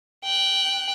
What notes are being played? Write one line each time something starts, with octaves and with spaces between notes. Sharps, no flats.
G5 F#6